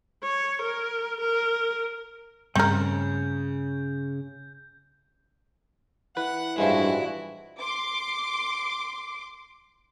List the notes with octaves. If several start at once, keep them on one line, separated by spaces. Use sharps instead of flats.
C#5
A#4
A#4
G2 C#3 G3 A3 C4 A#4 G6
E3 B4 F#5
A1 G2 F3 G#3 E4 F#4
C6 D6